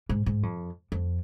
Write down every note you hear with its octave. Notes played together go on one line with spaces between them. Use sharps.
G#2
G#2
F2
F2